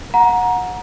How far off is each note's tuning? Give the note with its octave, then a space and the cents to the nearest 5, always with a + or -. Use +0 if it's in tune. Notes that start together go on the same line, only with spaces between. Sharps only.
F#5 -20 A#5 +20